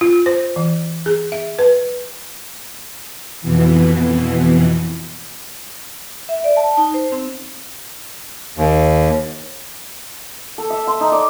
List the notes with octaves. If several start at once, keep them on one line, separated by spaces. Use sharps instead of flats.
F4
C5
E3
G#4
E5
B4
F2 B2 E3
E5
D5
A5
D#4
C5
C4
D#2
A4
E5
C6
D#4
D5